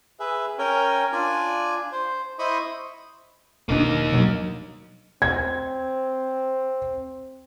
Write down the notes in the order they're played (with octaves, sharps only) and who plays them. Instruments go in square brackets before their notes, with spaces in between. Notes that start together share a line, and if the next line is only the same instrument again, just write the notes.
[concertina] G#4 B4 E5
C#4 A#4 C#5 G5 G#5
D4 F4 D5 G#5
C5
E4 C5 D#5 B5 C#6 D#6
[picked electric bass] E1 D4 [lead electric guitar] A#3 D#4
[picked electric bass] B2 F#3
[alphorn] C4 [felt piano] G#6